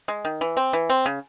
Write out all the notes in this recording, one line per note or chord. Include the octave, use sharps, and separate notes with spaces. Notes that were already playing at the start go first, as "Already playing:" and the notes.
G#3
D#3
E3
C4
E3
C4
C#3